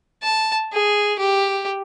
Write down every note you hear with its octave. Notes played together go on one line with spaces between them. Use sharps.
A5
G#4
G4